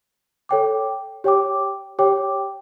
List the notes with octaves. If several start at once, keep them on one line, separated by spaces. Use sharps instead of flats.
A4 C#5 G5 D6
G4 C#5 G5 D6
G4 C#5 G5 D6